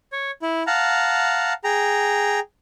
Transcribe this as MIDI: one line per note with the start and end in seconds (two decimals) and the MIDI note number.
0.12 0.31 73
0.42 0.63 64
0.67 1.53 77
0.67 1.53 78
0.67 1.53 81
0.67 1.53 82
1.64 2.40 68
1.64 2.40 79
1.64 2.40 82